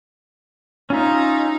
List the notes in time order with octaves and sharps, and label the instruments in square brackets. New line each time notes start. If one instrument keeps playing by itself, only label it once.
[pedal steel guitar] C#4 F4 E5 [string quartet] D#4